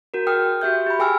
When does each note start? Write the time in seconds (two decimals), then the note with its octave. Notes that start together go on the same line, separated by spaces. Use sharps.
0.14 F#4 A#4
0.27 G#4 G5 D#6 F6
0.61 F#4 G4 E5 G6
0.86 G4 B5
0.99 G#4 G5 G#5 E6 F6